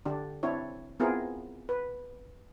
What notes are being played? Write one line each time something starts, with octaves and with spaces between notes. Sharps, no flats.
D3 D4 G4
C4 D4 E4 C#5
B3 C4 E4 F4 G#4 A#4
B4